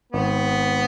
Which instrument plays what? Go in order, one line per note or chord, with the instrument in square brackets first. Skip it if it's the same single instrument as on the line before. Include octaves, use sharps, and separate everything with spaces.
[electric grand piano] G#1 [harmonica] B3